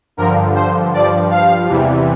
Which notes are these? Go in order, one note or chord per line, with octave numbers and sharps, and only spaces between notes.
G2 D3 F3 A#4
C5
G2 F3 D5
F5
E2 C3 E3 G3